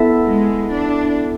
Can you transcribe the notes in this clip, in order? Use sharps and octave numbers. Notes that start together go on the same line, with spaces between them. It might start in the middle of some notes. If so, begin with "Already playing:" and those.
Already playing: B3 E4 A4 E5 A5
G#3
D4